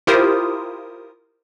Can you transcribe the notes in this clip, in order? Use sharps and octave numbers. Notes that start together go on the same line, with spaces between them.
E4 F4 G4 A#4 C5 D#6